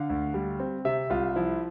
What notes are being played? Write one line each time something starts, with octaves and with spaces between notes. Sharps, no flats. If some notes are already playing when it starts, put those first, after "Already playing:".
Already playing: D3 F5
D2
G3
C4
C3 E5
C2 F4
F3 E4